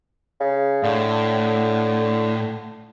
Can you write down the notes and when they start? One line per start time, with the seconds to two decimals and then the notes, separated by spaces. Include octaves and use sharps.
0.40 C#3
0.83 A2 D3